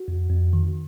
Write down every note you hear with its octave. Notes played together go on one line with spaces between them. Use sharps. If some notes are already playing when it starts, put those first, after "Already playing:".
Already playing: F#4
F2
F2
D#3